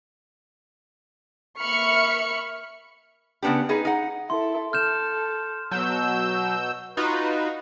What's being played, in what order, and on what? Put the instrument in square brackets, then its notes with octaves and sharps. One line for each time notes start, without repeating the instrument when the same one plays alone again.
[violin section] A#3 E5 B5 C#6 F6 C#7
[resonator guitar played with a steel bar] C#3 F3 B3 D4 G4
D#4 G#4 B4
D#4 F#5
[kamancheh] E4 A4 [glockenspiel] C6
[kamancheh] A4 [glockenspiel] F6 G6 E7
[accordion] B2 E6 G6 [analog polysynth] F#3
[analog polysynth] D#4 F4 F#4 [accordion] B4